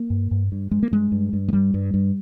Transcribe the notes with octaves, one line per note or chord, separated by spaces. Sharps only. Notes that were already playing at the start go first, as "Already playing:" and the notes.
Already playing: A#3
G2
G2
G2
G2 G#3
A#3
G2 G#3
G2
G2
G#3
G2 G3
G2
G2